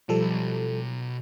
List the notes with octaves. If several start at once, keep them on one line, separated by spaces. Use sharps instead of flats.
B1 F3 G3 A4